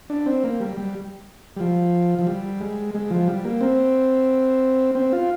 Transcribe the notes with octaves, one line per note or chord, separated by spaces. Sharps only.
D4
C4
A#3
G3
G3
G3
F3
F3
G3
G#3
G#3
F3
G3
A#3
C4
C4
F4